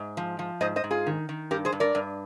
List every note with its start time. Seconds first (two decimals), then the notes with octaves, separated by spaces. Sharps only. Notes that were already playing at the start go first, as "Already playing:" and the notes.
Already playing: G#2
0.17 F3
0.39 F3
0.61 G#2 C5 D#5
0.76 C5 D#5
0.84 G#2
0.91 F4 G#4
1.07 D#3
1.29 D#3
1.51 G2 G4 A#4
1.65 G#4 C5
1.72 G2
1.80 A#4 D5
1.95 G2